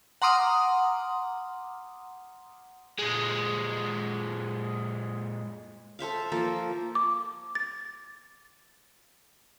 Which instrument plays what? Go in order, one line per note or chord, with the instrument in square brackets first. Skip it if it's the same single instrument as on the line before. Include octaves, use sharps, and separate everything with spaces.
[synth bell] F#5 A#5 C6 D6 D#6 F6
[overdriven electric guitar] A#2 G#3
[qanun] A4 C5 E5 F5
F3 A#3 A4
[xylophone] D6
A6